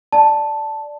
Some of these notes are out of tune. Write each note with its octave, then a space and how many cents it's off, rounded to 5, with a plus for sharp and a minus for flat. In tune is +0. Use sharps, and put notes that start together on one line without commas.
D5 +0 A5 +0